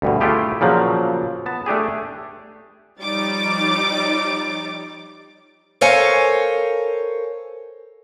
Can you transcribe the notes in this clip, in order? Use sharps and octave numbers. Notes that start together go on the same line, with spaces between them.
D2 G2 B2
A3 E4 F4 G4 G#4
A#2 C#3 F3 F#3
B3 A5
A3 D4 G4 G#4
F3 G3 D#4 C#5 D6 A6
A4 A#4 C5 C#5 F5 G#5